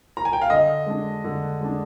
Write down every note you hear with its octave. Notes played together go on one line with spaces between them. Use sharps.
A#5
G#5
G5
F5
D3 D#5
G#3 D4
D3
G#3 D4